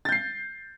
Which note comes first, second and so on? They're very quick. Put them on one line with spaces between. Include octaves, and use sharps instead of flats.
A6 G6 C7